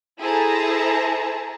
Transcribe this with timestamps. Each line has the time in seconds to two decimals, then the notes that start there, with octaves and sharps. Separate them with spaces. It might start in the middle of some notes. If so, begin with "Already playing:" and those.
0.19 E4 G#4 A4 C5 A5 A#5